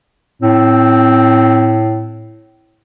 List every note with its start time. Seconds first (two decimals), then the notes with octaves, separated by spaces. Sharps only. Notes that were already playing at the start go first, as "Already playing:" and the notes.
0.42 A2 C4